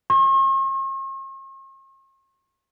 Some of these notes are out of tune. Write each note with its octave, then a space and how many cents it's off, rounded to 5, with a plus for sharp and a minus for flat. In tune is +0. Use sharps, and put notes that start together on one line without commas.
C#6 -45